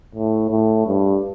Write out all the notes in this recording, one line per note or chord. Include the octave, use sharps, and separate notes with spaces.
A2
A2
G2